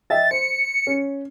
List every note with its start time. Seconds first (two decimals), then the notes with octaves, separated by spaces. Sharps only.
0.10 D#5 E5 G5 A6
0.31 C5 C#7
0.87 C#4